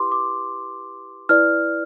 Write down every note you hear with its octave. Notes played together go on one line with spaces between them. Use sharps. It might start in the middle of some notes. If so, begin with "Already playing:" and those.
Already playing: E4 G4 B4 C6 D6
D6
E4 B4 D5 F6